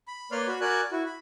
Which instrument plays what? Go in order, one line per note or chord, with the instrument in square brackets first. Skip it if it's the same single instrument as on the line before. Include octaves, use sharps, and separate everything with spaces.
[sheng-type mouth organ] B5
A#3 B4 C#5 D5 C6 F6
F#4 B5
F#4 A#4 D5 G#5 F#6
E4 F#4
B5